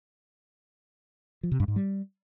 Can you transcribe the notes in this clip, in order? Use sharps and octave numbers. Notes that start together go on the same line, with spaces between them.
F3
C3
G2
G#2
G3